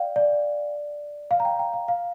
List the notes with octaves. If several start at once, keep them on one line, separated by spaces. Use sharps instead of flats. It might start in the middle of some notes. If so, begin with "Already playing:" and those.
Already playing: D5 F5 G5
D5
F5
A#5
G5
G5
F5
F5